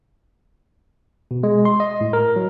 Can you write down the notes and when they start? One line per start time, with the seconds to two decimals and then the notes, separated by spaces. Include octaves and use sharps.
1.31 B2
1.43 G#3
1.65 C6
1.80 D#5
2.01 A2
2.13 A#4
2.36 F#3